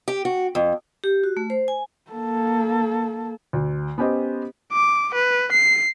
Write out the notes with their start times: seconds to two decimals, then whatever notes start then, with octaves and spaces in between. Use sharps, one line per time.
0.08 G4
0.25 F#4
0.55 F2
1.04 G4
1.24 F#4
1.37 A3
1.50 C5
1.68 G#5
2.11 A#3 A4
3.53 D2
3.98 B3 C#4 G4 C5 D#5
4.73 D6
5.15 B4
5.53 C7